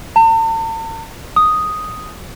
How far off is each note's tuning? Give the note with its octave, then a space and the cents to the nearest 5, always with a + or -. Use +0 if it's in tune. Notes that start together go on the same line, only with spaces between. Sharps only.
A5 +45
D#6 +0